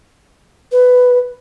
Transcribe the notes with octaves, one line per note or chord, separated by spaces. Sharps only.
B4